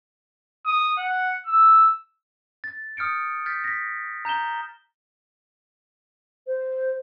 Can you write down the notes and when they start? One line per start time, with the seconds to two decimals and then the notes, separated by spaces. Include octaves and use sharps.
0.66 D#6
0.97 F#5
1.46 E6
2.64 A6
2.97 D#6 F6 G6 C#7 D7
3.46 F6 G6 A6 B6
3.64 A#6 B6
4.25 A#5 G6 E7 G7
6.47 C5